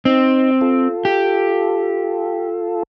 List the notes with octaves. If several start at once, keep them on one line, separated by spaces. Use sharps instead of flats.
C4 D#4
F4 A4
G4